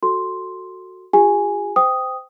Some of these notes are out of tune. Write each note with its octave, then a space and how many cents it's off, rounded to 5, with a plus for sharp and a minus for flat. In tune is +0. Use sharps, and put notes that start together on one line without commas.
F#4 +0 A4 +15 C6 +0
F4 +25 G#4 -45 G#5 -5
C5 -25 G5 +0 D#6 +0